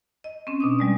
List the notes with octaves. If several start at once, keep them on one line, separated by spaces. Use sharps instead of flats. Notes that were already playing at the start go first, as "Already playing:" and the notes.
D#5
C4 C#4
B2 D4 D#6
G3 G#3 D5